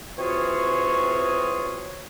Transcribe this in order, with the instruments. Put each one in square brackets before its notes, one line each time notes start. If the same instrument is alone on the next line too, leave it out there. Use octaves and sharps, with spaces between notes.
[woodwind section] E3 C4 F4 F#4 G#4 C#5